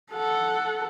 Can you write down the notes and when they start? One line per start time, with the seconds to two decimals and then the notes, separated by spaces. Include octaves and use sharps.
0.12 A4 F#5